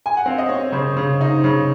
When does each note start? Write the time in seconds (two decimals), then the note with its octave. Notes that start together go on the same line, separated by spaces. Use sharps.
0.06 G#5
0.17 F#5
0.26 C4 F5
0.38 D#5
0.49 C4 C#5
0.72 C#3 C5
0.97 C#3
1.21 D#4
1.44 C#3